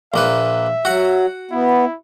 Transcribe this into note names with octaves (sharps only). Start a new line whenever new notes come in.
A#1 A#3 B4 E5
F#3 F#4 F#5
B3 E4